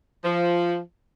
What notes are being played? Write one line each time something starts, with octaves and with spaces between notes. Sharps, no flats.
F3